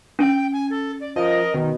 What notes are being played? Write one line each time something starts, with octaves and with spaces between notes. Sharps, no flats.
C#4 G5
G#5
A4
D5
F3 A#4 D#5
B2 D#3